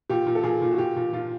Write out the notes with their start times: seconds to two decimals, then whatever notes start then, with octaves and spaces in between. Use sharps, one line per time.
0.09 A#2 G4
0.27 A#2
0.35 A4
0.43 A#2 G#4
0.62 A#2
0.71 F#4
0.78 A#2 G4
0.96 A#2
1.13 A#2 F4